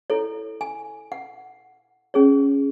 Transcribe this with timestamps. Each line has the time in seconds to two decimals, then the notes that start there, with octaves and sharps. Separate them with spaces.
0.10 E4 A4 C#5
0.61 G#5
1.12 F#5
2.14 C#4 G#4 C#5